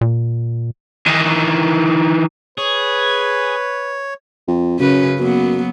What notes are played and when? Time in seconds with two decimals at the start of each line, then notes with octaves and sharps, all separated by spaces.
0.01 A#2
1.07 D#3 E3
2.58 G#4 B4 C#5
4.48 F2
4.79 F#2 C#3 C#4 B4
5.19 F#2 F#3 A#3 B3